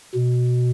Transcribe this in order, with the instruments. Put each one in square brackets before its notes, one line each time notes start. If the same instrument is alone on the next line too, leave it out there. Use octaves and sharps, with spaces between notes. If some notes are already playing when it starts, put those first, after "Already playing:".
[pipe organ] B2